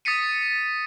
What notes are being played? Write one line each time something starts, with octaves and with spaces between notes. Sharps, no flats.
D#6 A6 B6 C#7 D#7